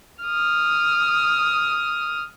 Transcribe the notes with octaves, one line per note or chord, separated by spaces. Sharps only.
D#6 F6